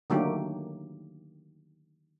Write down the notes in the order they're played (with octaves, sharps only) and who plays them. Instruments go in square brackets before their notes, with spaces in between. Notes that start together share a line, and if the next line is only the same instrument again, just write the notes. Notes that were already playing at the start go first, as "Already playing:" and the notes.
[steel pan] D3 D#3 F#3 A3 A#3 G4